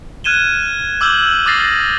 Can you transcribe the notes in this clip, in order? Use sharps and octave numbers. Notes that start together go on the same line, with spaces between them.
F6 F#6 G#6 D#7 E7 G7
D6 E6 F6 G6 F#7
D6 D#6 F6 A6 A#6 C7